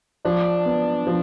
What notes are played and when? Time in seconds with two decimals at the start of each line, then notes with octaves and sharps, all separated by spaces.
0.25 F3 D4
0.66 B3
1.07 F3